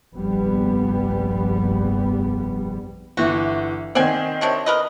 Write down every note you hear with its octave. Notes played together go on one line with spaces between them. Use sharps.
F1 A#1 G2 G3 B3
G1 E3 F#4
D#3 C4 D5 F#5 G#5
C3 D4 C#5
A#4 B4 D#5